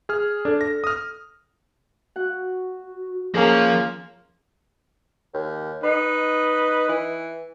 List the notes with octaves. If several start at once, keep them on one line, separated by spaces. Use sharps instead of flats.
G#4 F6
D4 A4
A#6
D#6 F6
F#4 F#5
F3 A#3 C#4 G#4
D#2
D#4 B4
E3